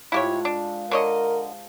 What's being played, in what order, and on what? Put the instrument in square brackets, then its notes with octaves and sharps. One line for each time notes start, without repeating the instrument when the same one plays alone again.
[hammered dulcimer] G#2 F4 A4 [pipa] E4 G4 C#5
[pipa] D4
[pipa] D3 C#5 D#5 [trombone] A#4